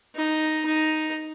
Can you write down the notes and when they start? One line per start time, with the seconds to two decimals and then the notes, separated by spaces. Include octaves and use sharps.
0.16 D#4
0.66 D#4